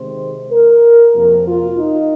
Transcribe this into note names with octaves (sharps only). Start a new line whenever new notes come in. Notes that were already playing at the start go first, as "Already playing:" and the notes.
Already playing: C3 D#3 G#3 C5
A#4
F2 C3 F3 A#3 A#4
F4
D#4